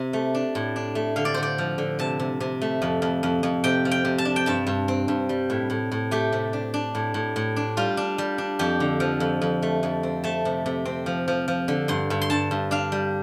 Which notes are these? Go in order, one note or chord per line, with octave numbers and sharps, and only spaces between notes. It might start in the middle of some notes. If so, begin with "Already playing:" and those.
Already playing: C3
A3
D4
A2
D4
A3
D3 F5
D5
D3 C5
D5
F3
D3
C3 A5
C3
C3
A3
F2
F2
F2
F2
C3 G5
F3
G5
C3
A5
D4
G5
G2 A5
G2
C4
G2
G3
A2
A2
A2
A3 G4
C3
D4
D4
A2
A2
A2
D4
G3 F4
D4
G3
D4
F2 G4
D3
F3
F2
F2
A3
F2
C4
A3 A5
C3
C3
C4
F3
F3
F3
D3
G2 C6
G2
C6
G2 A5
G2
D4 F5
G3